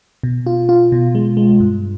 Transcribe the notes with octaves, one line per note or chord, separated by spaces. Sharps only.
B2
F4
F4
B2
G#3
G#3
G2